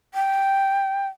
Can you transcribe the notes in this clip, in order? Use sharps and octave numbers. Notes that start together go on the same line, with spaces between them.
G5